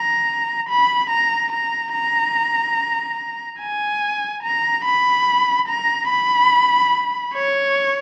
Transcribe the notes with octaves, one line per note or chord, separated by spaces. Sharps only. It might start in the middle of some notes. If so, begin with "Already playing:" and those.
Already playing: A#5
B5
A#5
A#5
A#5
G#5
A#5
B5
A#5
B5
C#5